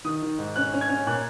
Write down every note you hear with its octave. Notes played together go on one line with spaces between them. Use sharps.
D#3 D#6
D#3
G#2
C#4 F#6
C#4
G#6
C#4
A#2 F#6